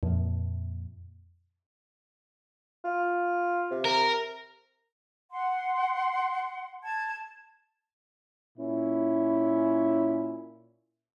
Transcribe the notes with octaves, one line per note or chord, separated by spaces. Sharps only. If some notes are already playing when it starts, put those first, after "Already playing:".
F2 A#2
F4
C3
A#4
F#5 C6
A5 G#6
A#2 C#4 E4